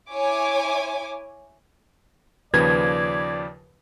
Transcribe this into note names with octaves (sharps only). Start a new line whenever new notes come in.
E4 C#5 G#5 D6
D#2 C#3 F3 B4 D5 G#6